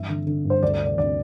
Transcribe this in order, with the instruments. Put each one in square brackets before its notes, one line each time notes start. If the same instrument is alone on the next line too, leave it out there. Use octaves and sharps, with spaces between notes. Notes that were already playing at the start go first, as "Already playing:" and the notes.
Already playing: [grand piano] G2 E3 E5
D3
D3
G2
C5
D2 D5
D5
C3
D5
D2 D5